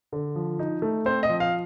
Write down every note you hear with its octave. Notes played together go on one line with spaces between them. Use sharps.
D3
F3
D#4
A3
C4 C5
D#5
F3
F5